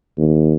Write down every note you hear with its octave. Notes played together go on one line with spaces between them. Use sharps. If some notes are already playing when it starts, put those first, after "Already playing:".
D#2